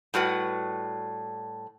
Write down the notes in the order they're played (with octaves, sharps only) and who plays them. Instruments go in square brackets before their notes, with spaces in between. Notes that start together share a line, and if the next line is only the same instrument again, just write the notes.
[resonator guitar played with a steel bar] A2 G3 F#4 B4